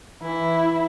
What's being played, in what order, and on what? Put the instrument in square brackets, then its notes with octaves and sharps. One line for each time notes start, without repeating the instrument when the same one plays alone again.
[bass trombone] E3 [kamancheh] E4